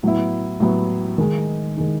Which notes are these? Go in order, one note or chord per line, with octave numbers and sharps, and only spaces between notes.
A2 F#3 B3 E4
A2 F#3 B3 E4
D#3 G#3 D#4
D#3 G#3 D#4